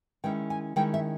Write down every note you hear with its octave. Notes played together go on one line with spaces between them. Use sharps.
D#3 G#3 C#4 E4 G5
G#5
D#3 G#3 C#4 E4 G5
E5